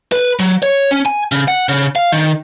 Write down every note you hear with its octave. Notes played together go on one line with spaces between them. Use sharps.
B4
F#3
C#5
C#4
G#5
C#3
F#5
C#3
F5
D#3